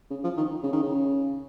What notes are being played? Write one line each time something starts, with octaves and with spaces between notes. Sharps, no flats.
C#3
F3
D#3
C#3
D#3
C#3